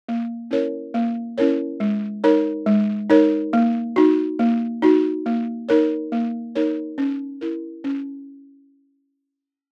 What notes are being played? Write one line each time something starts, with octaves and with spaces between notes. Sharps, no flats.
A#3
C#4 E4 A#4 C#5
A#3
C#4 E4 A#4 C#5
G#3
D#4 A#4 C#5
G#3
D#4 A#4 C#5
A#3
D#4 F#4
A#3
D#4 F#4
A#3
D#4 A#4 C#5
A#3
D#4 A#4 C#5
C#4
E4 A#4
C#4